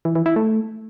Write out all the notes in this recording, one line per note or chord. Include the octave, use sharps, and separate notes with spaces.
E3
E3
E4
A3